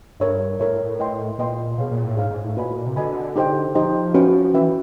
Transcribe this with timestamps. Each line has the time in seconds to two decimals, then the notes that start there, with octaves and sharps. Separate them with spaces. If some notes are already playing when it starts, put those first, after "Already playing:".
0.20 G2 A#4 C#5 E5
0.60 A2 A#4 C#5 E5
0.99 B4 D#5 G5 C6
1.38 A#2 B4 D#5 G5 C6
1.78 B2 G#4 C#5 F5
1.91 A#2
2.04 A2
2.17 G#2 G#4 C#5 F5
2.31 G#2
2.44 A2
2.57 A#2 F#4 B4 D#5 G#5 B5
2.71 A2
2.76 A#2
2.86 C3
2.96 D3 F#4 B4 D#5 G#5 B5
3.36 D#4 G4 C5 D#5 G5
3.75 F3 D#4 G4 C5 D#5 G5
4.14 C#4 F#4 B4 E5 G5
4.54 E3 C#4 F#4 B4 E5 G5